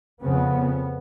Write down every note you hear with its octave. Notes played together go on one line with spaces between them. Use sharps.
F2 C#3 B3